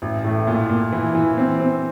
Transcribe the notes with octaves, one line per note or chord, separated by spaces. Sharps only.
A1
A2
A#2
A#2
E3
E3
C4
C4